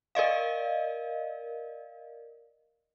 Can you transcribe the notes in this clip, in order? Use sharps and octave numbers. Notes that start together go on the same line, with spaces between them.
A#4 D5 D#5 F5